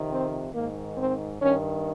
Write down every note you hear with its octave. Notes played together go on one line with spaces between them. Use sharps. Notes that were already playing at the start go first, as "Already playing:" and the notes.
Already playing: F2 C3 D#3
C4
G#2 D#3 A#3
C4
G2 D#3 C#4